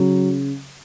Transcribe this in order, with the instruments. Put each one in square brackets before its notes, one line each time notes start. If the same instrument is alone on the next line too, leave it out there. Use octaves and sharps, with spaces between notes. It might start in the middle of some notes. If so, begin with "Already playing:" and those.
Already playing: [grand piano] C#3 F#3